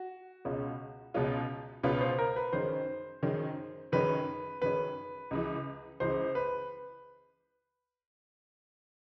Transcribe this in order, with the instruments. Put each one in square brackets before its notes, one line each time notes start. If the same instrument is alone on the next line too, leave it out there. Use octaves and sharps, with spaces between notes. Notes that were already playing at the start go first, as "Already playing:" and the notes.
Already playing: [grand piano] F#4
[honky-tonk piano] C#2 B2 G#3 C#4 F4
C#2 B2 G#3 C#4 F4
[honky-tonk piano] C#2 B2 G#3 C#4 F4 [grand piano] B4
[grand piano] C5
A#4
B4
[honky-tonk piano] F#2 D#3 G#3 C#4 [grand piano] C5
[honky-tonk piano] F#2 D#3 G#3 C#4
[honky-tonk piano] F#2 D#3 G#3 C#4 [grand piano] B4
[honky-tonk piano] F#2 D#3 G#3 C#4 [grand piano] B4
[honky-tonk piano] C#2 C#3 E3
[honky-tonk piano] C#2 C#3 E3 [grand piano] C5
[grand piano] B4